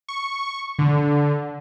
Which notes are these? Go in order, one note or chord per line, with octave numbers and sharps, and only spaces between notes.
C#6
D3